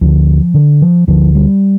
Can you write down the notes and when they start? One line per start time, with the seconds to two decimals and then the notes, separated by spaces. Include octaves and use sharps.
0.01 D2 D3 F3
0.54 D3
0.82 F3
1.07 D2 D3 F3
1.35 G3